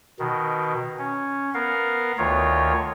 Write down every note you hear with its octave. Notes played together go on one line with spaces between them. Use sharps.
B2 D#3
C#4
B3 A#4 F5
D2 D#3 F4 C#5